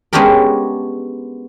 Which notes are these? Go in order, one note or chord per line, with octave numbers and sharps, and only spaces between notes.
G#3 B3 C#4 D4 G4 A#4